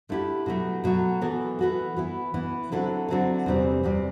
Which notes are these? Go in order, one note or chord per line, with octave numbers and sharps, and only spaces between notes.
D3 A3 E4 G4
B2 F#3 A3
B2 F#3 A3
E3 B3 F#4 A4
E3 B3 F#4 A4
E3 B3 E4
E3 B3 E4
D3 F#3 C4 E4 A4
D3 F#3 C4 E4 A4
E2 C3 G3 C4
E2 C3 G3 C4